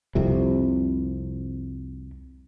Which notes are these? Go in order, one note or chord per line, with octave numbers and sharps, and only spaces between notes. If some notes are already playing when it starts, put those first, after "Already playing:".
C2 F2 C3